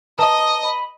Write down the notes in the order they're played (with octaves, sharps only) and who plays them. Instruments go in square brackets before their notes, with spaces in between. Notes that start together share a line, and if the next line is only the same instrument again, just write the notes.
[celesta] B4 A5 A#5 [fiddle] D#5 [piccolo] D#6
[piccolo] B5